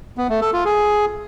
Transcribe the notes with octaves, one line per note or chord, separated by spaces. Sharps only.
B3
A3
A4
F4
G#4